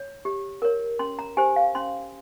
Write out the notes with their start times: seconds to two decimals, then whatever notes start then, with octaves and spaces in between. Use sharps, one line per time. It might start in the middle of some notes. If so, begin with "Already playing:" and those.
Already playing: C#5
0.25 G4
0.62 A#4 C#5
0.99 C#4 C6
1.19 A#5
1.37 G4 C5 G#5
1.56 F5
1.75 C#4 C6